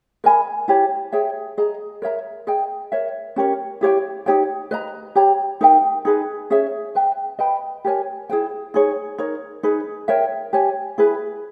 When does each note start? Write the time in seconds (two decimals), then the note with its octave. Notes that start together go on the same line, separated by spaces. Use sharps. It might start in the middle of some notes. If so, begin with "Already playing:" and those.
0.24 A#4 D#5 G#5 B5
0.68 E4 G4 C#5
1.12 G#4 C#5 E5 G5
1.58 G#4 D#5 A#5
2.02 A#4 C#5 E5 A#5
2.47 G#4 D#5 G5
2.92 A#4 C#5 E5
3.36 C#4 G4 A#4 C#5
3.81 E4 G4 C#5 G5
4.26 D#4 G4 C#5 G5
4.71 B4 D#5 A#5
5.15 G4 C#5 G5 A#5
5.61 D#4 A#4 E5 G5
6.05 D#4 G#4 B4
6.50 C#4 G#4 C#5 E5
6.95 B4 E5 G5
7.39 B4 D#5 G5 B5
7.85 G4 A#4 C#5 G#5
8.30 E4 G#4 B4 G5
8.74 D#4 G#4 C#5
9.18 D#4 A#4 C#5
9.63 D#4 G#4 B4
10.08 A#4 C#5 E5 G5
10.53 G4 C#5 G#5
10.98 E4 G#4 B4